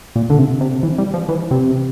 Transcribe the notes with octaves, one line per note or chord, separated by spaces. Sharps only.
A#2
D3
C3
C3
E3
G3
F3
E3
C3